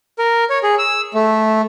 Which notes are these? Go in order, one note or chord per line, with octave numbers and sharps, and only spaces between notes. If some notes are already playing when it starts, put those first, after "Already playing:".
A#4
C#5
G#4
E6
A3